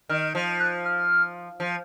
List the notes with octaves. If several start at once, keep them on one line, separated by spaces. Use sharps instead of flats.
D#3 F6
F3
F#6
F6
F3